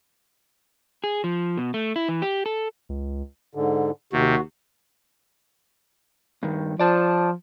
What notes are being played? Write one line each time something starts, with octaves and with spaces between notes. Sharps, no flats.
G#4
F3
B2
A3
E4
E3
G4
A4
C#2
G#2 D3
D#2 C3 F#4
G2 D#3
F3 D5 A5